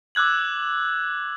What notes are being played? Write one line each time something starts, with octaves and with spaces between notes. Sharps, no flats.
D6 E6 F#6 G#6 F#7